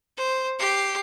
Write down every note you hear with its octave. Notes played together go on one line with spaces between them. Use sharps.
C5
G4 C7